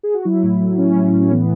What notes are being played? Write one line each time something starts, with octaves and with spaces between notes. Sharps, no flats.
G#4
F#4
F#3 E4
A2
F#3
A2 C#4
F#3
A2
C#4
E3 B3